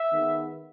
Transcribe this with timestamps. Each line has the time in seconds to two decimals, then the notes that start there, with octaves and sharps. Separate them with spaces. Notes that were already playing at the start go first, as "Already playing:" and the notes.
Already playing: E5
0.11 D#3 G#3 B3